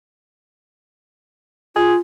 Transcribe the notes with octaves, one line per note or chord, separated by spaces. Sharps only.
F4 G#4